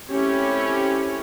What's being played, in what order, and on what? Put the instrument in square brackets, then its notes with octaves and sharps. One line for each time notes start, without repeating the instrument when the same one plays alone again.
[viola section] A3 C4 C#4 E4 G4 C#5